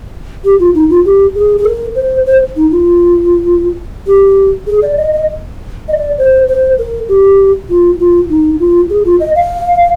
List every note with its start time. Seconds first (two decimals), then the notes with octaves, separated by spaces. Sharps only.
0.44 G4
0.60 F4
0.74 D#4
0.90 F4
1.05 G4
1.35 G#4
1.58 G#4
1.65 A#4
1.95 C5
2.26 C5
2.56 D#4
2.71 F4
4.07 G4
4.67 G#4
4.82 D5
4.97 D#5
5.12 D#5
5.88 D#5
5.93 D5
6.18 C5
6.48 C5
6.79 A#4
7.09 G4
7.70 F4
7.99 F4
8.29 D#4
8.60 F4
8.90 G#4
9.05 F4
9.20 D#5
9.35 F5